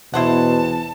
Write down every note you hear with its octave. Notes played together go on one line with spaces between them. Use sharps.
E2 B2 E4 C5 F#5 A5